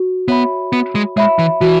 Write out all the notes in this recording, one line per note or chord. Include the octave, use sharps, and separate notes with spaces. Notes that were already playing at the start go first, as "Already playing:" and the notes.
Already playing: F#4
B3 C#5 E5 B5
B3 F#4
G#3
G#3 C#5 E5 B5
E3
E3 F#4